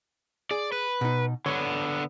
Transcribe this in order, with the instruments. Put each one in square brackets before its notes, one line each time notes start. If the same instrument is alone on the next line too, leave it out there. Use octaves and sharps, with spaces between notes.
[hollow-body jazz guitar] G#4 [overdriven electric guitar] D5
[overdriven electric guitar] B4
[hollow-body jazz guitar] B2 D#4
[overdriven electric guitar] D3 B3 [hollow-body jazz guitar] C#5